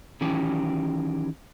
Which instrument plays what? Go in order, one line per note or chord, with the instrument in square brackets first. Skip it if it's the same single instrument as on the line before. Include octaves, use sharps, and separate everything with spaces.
[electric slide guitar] D#3 E3 F#3 C#4 E4 G4